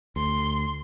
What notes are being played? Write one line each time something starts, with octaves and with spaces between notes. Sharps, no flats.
D2 C6